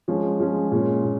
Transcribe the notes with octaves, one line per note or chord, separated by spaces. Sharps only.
F3 G#3 C#4
F3 G#3 C#4
A#2 G#3 C#4
A#2